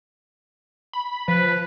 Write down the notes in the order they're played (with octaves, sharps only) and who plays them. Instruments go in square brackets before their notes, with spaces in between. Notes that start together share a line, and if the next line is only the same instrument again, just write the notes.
[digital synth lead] B5
[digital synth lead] F3 [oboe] B4